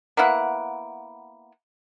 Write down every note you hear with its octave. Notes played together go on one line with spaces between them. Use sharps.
A#3 B3 E4 F#5